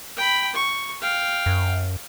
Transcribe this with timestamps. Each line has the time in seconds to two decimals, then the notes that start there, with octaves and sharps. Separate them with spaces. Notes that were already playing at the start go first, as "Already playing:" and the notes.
0.16 G5 B5
0.55 C#6
1.02 F5 G5
1.46 F#2